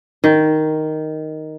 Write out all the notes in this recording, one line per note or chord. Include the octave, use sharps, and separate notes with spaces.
D#3